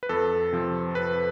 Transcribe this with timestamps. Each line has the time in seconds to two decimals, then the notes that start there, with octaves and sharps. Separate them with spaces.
0.03 B4
0.09 F2 A4
0.53 C3 F3
0.95 F2 B4